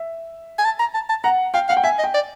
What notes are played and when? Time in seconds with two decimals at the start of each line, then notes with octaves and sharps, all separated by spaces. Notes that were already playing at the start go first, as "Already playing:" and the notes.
Already playing: E5
0.58 G#5
0.64 A5
0.79 A#5
0.94 A5
1.09 A5
1.24 F#5 A#5
1.54 F5 G5
1.69 F5 F#5
1.77 G5
1.84 E5 G#5
1.99 D#5
2.04 G5
2.14 D5